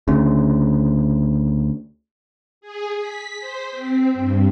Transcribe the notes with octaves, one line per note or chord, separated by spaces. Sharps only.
D2 C#3
G#4
B6
C5
C4
G2